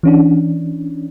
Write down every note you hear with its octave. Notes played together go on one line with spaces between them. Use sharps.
E3 C#4 D4